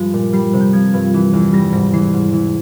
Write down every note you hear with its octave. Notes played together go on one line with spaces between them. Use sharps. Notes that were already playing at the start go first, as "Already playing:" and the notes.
Already playing: G2 F3 G#3
A#2
G3 C7
C3
G6
F3 G#6
G2
E3
E2
G3 A#6
G#2 A#6
E3 C7
G#2
E3